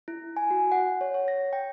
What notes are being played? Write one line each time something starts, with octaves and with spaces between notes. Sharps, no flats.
E4
G#5
F#4
F#5
C#5
C#5
A#6
G5